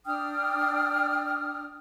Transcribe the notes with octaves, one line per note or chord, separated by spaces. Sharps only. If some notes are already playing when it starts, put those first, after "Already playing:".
D4 G5 D#6 F6